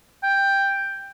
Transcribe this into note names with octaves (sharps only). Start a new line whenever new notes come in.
G5